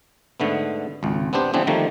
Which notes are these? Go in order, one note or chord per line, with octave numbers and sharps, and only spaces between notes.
G#2 D3 A3 B3
G#1 C#2
B3 C4 D4 G4 C5
C#3 E3 G3 B3 C4 D4
D3 D#3 F3 G3 A3 A#3